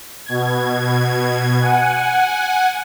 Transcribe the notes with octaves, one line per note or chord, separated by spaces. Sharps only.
B2 G#6
F#5 G#5